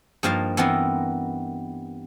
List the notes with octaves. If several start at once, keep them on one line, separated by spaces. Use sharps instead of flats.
G2 F3 A#3 D#4 F5 A5
E3 B3 C4 D#4 A4 A#4